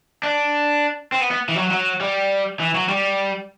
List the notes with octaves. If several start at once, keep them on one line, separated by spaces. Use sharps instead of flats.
D4
C4
B3
B3
E3
F#3
F#3
G3
E3
F#3
G3